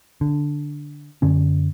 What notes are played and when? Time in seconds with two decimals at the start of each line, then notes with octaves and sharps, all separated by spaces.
0.21 D3
1.22 F#2 D3 C#4